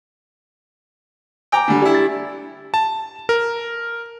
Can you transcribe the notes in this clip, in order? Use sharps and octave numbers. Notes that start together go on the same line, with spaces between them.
G5 G#5 A#5 D6
D3 G3
D4 E4 G4
A6
A5
A#4